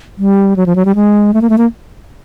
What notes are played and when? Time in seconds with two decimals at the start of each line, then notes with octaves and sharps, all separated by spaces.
0.18 G3
0.56 F#3
0.66 F3
0.76 F#3
0.85 G3
0.95 G#3
1.34 A3
1.42 A#3
1.50 A3
1.58 A#3